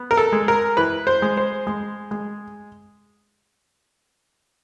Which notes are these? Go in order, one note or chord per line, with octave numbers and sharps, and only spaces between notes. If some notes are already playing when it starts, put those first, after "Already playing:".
Already playing: B3
A#4
A4
G#3
A#4
E3 B4
C5
G#3
C5
G#3
G#3